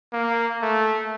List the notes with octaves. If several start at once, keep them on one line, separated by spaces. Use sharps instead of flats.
A#3
A3